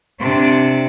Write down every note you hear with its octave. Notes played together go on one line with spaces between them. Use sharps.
C3 D4